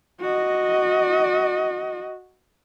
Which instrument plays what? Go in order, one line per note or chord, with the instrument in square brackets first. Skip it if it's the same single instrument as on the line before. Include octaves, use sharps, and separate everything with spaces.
[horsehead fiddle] F#4 D#5